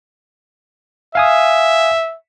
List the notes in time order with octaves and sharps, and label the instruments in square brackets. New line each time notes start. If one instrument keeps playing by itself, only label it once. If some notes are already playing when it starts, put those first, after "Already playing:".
[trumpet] E5 [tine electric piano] F5 G#5 D#6